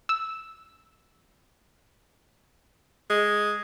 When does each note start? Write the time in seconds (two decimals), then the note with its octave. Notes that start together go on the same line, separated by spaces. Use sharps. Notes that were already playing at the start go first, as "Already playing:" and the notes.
0.09 E6
3.10 G#3